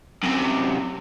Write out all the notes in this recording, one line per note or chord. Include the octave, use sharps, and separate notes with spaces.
F#2 C3